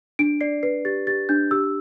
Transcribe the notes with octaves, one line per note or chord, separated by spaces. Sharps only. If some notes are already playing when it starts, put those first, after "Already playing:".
D4 D7
D5 C7
B4 C7
G4 A6
G4 A6
D4 G6
G4 E6